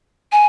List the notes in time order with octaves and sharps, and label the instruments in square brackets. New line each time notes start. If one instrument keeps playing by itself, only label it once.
[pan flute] G#5